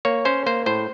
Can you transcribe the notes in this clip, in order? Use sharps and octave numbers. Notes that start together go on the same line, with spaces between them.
A#3 C#5
C#4 C5
A#3 C5
A2 C5